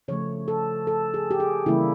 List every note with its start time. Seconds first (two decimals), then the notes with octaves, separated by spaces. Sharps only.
0.08 C#3 F3 A3 C#5
0.48 A4
0.87 A4
1.14 G#4
1.31 G4
1.40 G#4
1.66 C#3 E3 G3 A#3 E4